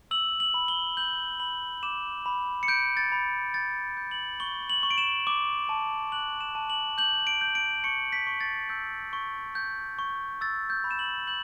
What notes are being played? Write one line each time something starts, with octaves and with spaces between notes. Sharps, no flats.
E6 F#7
F#7
B5
G7
G6 F#7
B5 F#7
D6 E7
B5
C#7
G6 D7
A6
B5
G6 A6
G6
F#7
C#6 G7
F#7
C#6
D7
E7
D6
A5
F#6 F#7
E7
A5
F#7
G6 F#7
D7
G6
D7
C#6 C#7
B6
C#6
A6
E6 G6
C#6
G6
C#6
E6 A6
G6
B5
E7
F#7
G6 F#7